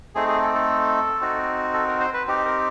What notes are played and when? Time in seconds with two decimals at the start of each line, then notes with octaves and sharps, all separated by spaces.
0.15 A3 C4 D#4 G#4
0.28 G#4
0.42 A4
0.55 A4
1.21 C4 D#4 F#4
1.74 A4
1.88 A#4
2.00 C5
2.14 B4
2.27 C4 D#4 G4
2.45 A#4